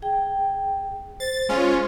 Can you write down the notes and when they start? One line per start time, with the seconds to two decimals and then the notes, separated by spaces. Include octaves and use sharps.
0.02 G#4 G5
1.20 C5 A6
1.49 G#3 C#4 F4 C5